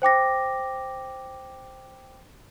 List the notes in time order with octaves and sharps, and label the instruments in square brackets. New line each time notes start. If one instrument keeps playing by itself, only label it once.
[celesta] C5 G5 D6 A#6